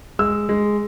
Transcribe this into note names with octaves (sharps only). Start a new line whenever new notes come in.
G#3 E6
G#3